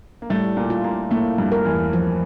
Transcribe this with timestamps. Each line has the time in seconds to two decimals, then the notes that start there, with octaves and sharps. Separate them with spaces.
0.22 A#3
0.30 A2 G3 A3
0.57 A#2 A#3
0.70 F4
0.84 A#2 A#3
1.11 A2 A3 A#3
1.38 G2 G3
1.52 A#4
1.65 E2 E3
1.93 F3